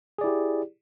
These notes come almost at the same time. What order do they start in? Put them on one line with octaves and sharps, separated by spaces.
G#4 D5 E4 G4